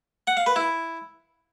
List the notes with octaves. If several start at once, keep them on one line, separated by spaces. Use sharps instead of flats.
F#5
F5
B4
E4